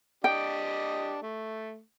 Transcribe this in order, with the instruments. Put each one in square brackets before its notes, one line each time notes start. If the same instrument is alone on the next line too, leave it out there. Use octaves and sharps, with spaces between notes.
[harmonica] D4 G4 D#5 [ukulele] G5
[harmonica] A3